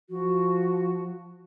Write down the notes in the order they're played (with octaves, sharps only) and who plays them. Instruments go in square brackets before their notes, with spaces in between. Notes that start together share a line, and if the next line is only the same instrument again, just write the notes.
[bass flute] F3 [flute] F#4